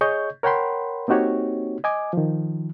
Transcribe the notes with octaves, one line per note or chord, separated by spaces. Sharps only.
G#4 C#5 D#5 C#6 G6
A#4 C#5 F#5 G5 B5 C6
A#3 C4 D#4 F#4 G4 C#5
D#5 G#5 D6
D#3 F3